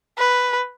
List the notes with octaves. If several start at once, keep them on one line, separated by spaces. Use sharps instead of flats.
B4